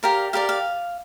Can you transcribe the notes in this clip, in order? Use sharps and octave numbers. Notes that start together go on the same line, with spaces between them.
G4 A#4 D5 F5
G4 A#4 D5 F5
F5